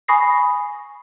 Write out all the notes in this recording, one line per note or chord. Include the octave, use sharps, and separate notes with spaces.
G#5 B5 C#6 D#6 A#6 C7